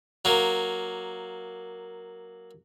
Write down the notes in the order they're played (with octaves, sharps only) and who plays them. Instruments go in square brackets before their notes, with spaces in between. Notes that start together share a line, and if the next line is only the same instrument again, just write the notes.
[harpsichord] F#3 A#3